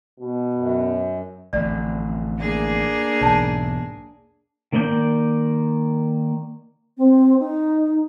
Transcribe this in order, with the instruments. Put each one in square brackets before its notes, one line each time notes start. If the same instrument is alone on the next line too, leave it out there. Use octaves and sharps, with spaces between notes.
[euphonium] B2
[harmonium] F#2
[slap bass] A1 F2 D3 [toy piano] D5
[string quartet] A#3 D4 G#4
[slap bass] B1 E2 G#2 [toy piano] C#5 A5
[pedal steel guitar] D#3 A#3 D5 D#5 G6
[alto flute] C4
D#4